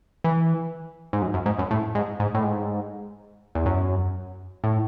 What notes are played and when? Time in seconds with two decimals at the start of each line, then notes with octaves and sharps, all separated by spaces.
0.24 E3
1.13 G#2
1.22 F#2
1.34 F#2
1.46 G#2
1.59 F#2
1.71 A2
1.95 G#2
2.20 G#2
2.34 A2
2.44 G#2
3.55 E2
3.66 F#2
4.64 A2